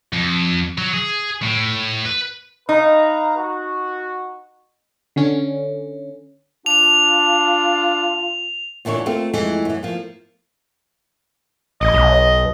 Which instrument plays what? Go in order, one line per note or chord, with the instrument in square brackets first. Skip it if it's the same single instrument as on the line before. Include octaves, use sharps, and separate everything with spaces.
[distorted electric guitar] F2
F#3
G#4
A2
B4
[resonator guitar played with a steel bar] D#4 [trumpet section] B4 F5 A#5
[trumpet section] F#4
[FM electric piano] D3 C#4
[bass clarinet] D4 [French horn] F4 [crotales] F7
[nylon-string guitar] D2 A#2 E3 D4 C#5
A3 A#3 C4 F4
F2 E3 G#3 A3
F#2 E3
F3 A#3
[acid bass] A1 [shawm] D#5
[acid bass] B1